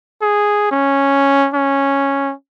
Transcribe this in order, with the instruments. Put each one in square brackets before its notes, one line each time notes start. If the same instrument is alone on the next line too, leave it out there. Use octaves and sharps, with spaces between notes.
[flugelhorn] G#4
C#4
C#4